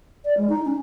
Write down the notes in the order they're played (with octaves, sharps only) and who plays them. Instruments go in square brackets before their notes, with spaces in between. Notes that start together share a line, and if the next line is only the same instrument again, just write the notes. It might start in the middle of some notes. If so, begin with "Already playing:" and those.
[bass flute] D5
G#3
D#4
C#4